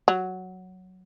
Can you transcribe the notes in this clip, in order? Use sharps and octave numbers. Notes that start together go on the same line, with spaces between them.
F#3